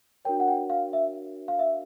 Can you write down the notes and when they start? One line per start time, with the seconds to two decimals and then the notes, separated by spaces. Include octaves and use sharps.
0.25 D4 F#4 A#4 C#5 G5
0.40 F#5
0.48 G5
0.70 F5
0.93 E5
1.48 F5
1.59 E5